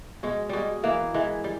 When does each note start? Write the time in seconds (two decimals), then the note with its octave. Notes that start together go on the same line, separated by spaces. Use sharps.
0.23 B2 G#3
0.49 B2 G3 G#3
0.83 E3 A#3
1.14 E3 G#3
1.44 G3